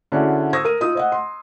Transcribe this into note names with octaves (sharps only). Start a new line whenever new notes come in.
D3 C#4 E4 F#4 G#4 D5
C5 C#6 D#6 E6 G#6 A#6
A#4 D#7
D#4 F4 D#6
C5 D#5 F#5
C6